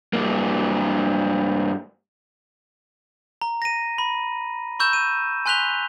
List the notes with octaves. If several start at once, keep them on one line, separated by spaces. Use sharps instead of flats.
G2 A#3
A#5
A#6 D#7
B5
B5 C#6 E6 G6 E7
D#7
G#5 C6 F#6 B6 F7 G7